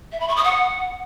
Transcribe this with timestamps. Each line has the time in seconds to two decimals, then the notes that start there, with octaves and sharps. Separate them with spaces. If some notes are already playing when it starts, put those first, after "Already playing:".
0.12 E5
0.20 B5
0.28 C#6
0.36 D#6
0.44 F#5